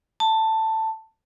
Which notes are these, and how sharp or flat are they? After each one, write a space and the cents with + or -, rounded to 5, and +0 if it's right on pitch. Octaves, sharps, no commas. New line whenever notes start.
A5 +10